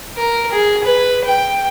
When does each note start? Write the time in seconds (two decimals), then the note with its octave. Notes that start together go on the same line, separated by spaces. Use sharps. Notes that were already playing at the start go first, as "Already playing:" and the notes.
0.17 A#4
0.52 G#4
0.84 B4
1.26 G5